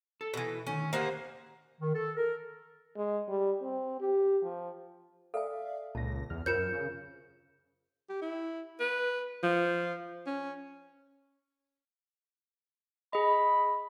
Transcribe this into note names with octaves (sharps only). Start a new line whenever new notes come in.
A4
B2 E3
D2 D#3 C#4
A#3 G4 G#4 C5 F5 F#5
D#3
A4
A#4
G#3
G3
C4
G4
F3
A4 D5 E5 F5 G#5
C#2 A#2 A5 A#6
E2 F6
F#2 F4 A#4 C5 G6 C#7 E7
C#3
G4
E4
B4
F3
C#4
G#4 D#5 B5